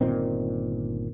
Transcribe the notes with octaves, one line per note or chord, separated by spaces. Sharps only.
G1 A#2 D#3 C4